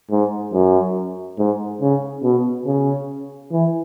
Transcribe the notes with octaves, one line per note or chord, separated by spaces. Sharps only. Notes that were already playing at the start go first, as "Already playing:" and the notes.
G#2
F#2
G#2
C#3
B2
C#3
E3